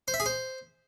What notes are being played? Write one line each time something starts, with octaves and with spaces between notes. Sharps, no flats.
C5
E5
G#4
C5